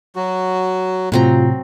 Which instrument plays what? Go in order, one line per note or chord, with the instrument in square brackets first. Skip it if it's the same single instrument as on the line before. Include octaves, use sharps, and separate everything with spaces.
[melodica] F#3 F#4
[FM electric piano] A2 C3 [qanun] F#3 C4 A#5 [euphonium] F4